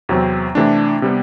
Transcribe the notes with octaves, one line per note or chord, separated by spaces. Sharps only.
E2 C3 F#3 C4
C3 E3 A3 D4
C3 G3 B3